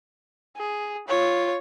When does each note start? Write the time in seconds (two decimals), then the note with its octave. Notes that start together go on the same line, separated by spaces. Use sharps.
0.57 G#4
1.08 F4 C#5